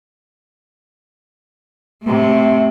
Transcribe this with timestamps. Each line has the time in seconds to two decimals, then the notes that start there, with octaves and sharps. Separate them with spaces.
2.03 C3 A3